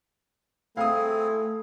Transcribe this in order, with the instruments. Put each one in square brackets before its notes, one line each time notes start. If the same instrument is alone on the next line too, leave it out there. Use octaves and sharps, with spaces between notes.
[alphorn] A3 [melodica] C4 E4 G#4 [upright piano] F5 D#6